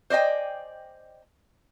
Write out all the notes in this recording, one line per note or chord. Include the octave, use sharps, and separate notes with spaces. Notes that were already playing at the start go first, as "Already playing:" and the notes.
C5 D5 D#5 G5 G#5